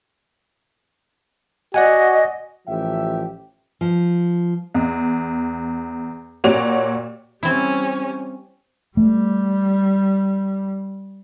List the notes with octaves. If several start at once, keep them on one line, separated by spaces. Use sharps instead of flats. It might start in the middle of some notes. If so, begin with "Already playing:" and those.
F#4 D5 D#5 F#5 G#5
A1 F3 G4 E5 G5
F3
E2
A#2 F#4 G4 C#5 D5 F7
G3 C4 C#4 E4
G3 A3